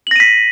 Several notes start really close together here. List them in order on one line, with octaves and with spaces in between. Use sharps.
F#7 A#6 D#7 B6